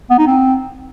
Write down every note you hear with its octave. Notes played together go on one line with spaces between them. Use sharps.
B3
D#4
C4